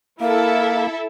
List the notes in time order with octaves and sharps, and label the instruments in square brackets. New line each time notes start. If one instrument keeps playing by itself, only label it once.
[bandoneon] A#3 [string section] E4 A4 E5 [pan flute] A#4